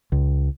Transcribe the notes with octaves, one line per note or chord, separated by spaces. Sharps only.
C#2